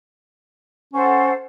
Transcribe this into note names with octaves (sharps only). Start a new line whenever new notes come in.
C#4 A4 C5 F#5